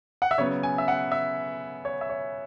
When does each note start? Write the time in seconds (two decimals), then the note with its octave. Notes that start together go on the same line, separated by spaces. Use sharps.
0.22 F#5
0.31 E5
0.38 C#3 F#3 B3 C#5
0.63 G#5
0.78 E5
0.88 F#5
1.12 E5
1.85 C#5
2.01 E5
2.10 C#5